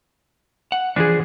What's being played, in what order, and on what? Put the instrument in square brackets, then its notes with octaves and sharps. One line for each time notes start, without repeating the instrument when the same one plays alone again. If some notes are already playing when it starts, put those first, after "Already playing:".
[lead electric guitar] F#5
[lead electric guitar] E3 F3 [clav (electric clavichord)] D4 G#4